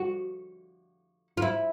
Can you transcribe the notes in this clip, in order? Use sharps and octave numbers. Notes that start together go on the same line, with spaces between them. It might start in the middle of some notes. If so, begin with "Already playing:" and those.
Already playing: F#4
F4
E4